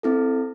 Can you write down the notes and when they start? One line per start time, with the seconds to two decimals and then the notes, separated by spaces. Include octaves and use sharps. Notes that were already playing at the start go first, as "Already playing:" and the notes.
0.03 C4 E4 A4